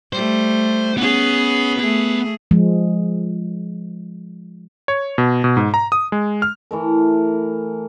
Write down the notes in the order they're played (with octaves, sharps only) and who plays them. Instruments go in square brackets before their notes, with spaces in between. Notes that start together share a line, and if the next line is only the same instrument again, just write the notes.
[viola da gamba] G3 A3 [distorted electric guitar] C5
[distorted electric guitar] B3 [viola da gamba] C#4 G#4
[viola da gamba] A3 G#4
[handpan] F3 G#3
[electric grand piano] C#5
B2
B2
G#2
A#5
D#6
G#3
F6
[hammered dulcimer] E3 A3 A#4